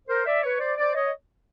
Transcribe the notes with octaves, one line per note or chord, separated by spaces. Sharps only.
A#4 C5
D5 E5
B4 C#5
C5 D5
C5 D5
C#5 D#5